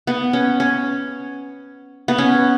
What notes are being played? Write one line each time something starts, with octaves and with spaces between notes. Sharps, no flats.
B3
C#4
C#4
B3
C#4